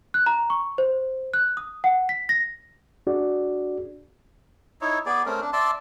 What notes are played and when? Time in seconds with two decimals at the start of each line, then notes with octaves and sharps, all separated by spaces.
0.14 F#6
0.26 A#5
0.50 C#6
0.78 C5
1.34 F#6
1.57 D#6
1.84 F#5
2.09 B6
2.29 A#6
3.07 D4 F#4 G#4 D5
4.81 D#4 E4 C#5
5.06 B3 G#4 D5
5.26 A3 C4 C#4 A#4
5.41 D4
5.53 D5 E5 A5 C6